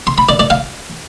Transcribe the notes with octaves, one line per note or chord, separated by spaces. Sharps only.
C6
B5
D5
D5
F5